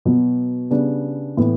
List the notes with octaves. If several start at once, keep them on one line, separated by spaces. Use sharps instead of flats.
B2 F#3 B3
C#3 G3 B3 D4
A2 E3 B3